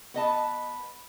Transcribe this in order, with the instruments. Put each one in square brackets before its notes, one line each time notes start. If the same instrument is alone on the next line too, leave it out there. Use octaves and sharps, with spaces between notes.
[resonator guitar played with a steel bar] B3 D#5 A5